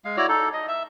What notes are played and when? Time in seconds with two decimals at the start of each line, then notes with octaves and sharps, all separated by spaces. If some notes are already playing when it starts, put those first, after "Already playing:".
0.05 G#3 F5
0.17 E4 F#4 C#5 D5
0.29 D#4 A4
0.53 D#5
0.68 E5